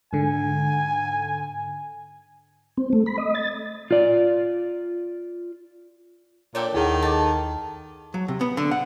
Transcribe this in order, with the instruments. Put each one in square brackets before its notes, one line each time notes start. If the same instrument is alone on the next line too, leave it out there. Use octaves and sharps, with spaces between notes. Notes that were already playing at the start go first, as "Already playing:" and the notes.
[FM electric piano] G#2 D3 [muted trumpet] G#5
[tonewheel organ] C4
A3
B5
D#5
A6
[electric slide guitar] F4 D5
[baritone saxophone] A#2 [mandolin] D4 G4 A4 [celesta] C#5
[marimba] D#2 F#5 [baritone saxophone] D#3 [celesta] E4 G#4
[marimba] A4 D#5 D6 [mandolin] A5
[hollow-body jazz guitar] F#3
C3
B3
D3
F#5